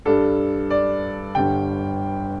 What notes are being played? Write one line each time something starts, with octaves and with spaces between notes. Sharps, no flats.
G2 G3 D4 A4
D5
G1 G2 D3 G3 G5